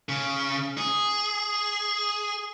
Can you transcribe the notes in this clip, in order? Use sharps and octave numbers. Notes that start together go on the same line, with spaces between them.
C#3
G#4